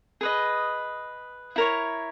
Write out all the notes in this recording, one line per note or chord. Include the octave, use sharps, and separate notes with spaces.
G#4 B4 D#5
E4 A#4 C#5